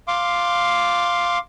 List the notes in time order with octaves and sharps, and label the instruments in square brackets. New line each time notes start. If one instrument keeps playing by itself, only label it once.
[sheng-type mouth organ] F5 C6 D6